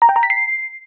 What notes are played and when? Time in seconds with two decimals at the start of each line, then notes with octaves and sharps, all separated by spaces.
0.02 A#5
0.09 G5
0.16 A#5
0.23 B6
0.30 C7